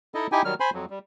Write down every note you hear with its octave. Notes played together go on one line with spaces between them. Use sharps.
D#4 E4 A4 D#5
D#4 E4 G4 G5 G#5
D#3 F#3 G3 F6
C5 G#5 B5 C6
F2 F#3
G3